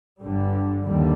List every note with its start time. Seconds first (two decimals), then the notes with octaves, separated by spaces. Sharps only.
0.22 G1 G2 D3 G3
0.84 D#2 D3 G3